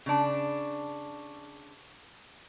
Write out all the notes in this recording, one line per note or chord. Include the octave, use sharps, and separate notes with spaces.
C#3 D4